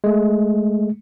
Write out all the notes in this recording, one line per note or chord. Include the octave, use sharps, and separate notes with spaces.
G#3 A3